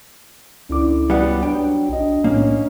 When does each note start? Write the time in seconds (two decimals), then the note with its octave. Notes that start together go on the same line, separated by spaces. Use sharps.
0.70 C#2 D3 C#4 E4 D6
1.10 F#3 G3 B3 F#5
1.43 D4 G5
1.89 B1 D4 D#5
2.24 A2 A#3 C#4